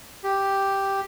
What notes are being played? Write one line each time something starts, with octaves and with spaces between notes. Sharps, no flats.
G4